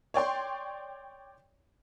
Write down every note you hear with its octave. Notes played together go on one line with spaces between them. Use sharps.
C#5 D5 G5 C6